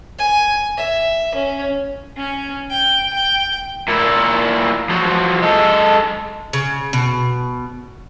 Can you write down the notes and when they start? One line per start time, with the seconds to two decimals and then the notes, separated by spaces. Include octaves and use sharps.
0.19 G#5
0.78 E5
1.35 C#4
2.17 C#4
2.70 G5
3.13 G5
3.89 A#2 E4
4.89 F3 F#3
5.43 G#3 A4
6.53 C#3
6.93 B2